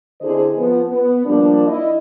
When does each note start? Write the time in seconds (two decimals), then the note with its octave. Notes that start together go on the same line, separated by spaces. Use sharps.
0.21 D3 C4 E4 G#4 C5 D#5
0.57 F3 B3
0.88 B3
1.25 F3 G3 A#3 D4
1.67 E4 D#5